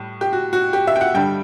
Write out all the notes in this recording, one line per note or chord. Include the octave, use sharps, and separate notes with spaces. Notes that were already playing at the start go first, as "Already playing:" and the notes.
Already playing: A2 G3
G4
F#4
F#4
G4
E5
G5
F#5
G2 D3 G3 G5